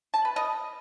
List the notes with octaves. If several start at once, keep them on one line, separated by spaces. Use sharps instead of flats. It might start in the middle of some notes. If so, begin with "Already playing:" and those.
A5
B4
D#5